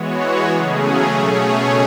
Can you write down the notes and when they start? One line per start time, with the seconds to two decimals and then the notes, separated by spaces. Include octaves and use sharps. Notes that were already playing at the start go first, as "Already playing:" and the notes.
Already playing: E3 G#3 B3 F#4 C#5
0.49 C#3 F#3 A3 C#4 G#4
1.15 B2 A3 C#4 G#4 C#5